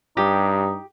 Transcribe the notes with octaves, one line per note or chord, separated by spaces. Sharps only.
G2 D#4 G4